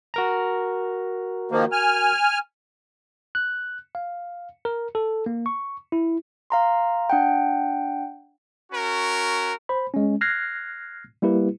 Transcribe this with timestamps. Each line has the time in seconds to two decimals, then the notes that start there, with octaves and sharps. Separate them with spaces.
0.14 F#4 A#4 A#5
1.52 D#3 F3 A#3
1.72 G#5 F6
3.35 F#6
3.95 F5
4.65 A#4
4.95 A4
5.26 A#3
5.46 C#6
5.92 E4
6.50 F5 A#5 C6
7.10 D4 F#5 G5
8.72 C#4 F#4 A#4
9.69 C5 B5
9.94 G#3 C#4
10.21 F6 F#6 G#6 A#6 C7
11.22 G3 A#3 E4 G4 B4